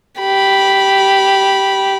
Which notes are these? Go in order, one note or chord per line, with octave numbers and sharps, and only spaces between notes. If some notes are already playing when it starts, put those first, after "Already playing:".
G4 B5